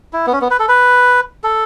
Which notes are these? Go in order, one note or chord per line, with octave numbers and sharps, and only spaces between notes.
E4
B3
C#4
B3
B4
A4
B4
A4